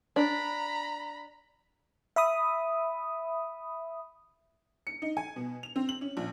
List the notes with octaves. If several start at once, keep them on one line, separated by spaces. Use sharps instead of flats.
D4 A#5 B5
E5 B5 D#6
C#7
D#4
G#5
B2
F7
C4
F#7
C#4
A#1